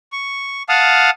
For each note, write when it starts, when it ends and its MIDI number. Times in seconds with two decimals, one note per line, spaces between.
0.12 0.63 85
0.69 1.10 77
0.69 1.10 78
0.69 1.10 81
0.69 1.10 87
0.69 1.10 89